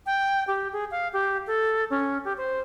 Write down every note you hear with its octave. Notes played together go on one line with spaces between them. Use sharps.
G5
G4
G#4
F5
G4
A4
C#4
G4
C5